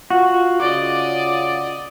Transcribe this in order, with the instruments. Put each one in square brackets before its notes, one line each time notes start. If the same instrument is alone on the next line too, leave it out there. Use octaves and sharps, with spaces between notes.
[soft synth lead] F4 [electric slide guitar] F#4
[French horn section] C#3 F4 [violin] D5 D#5 [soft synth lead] D6